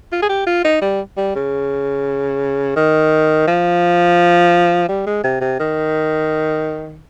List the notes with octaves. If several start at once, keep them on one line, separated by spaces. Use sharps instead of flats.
F4
G#4
G4
F4
D#4
G3
G3
C#3
D#3
F3
G3
G#3
C3
C3
D#3